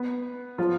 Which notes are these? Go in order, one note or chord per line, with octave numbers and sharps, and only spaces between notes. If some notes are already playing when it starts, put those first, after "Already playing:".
Already playing: B3 B4
F3 F4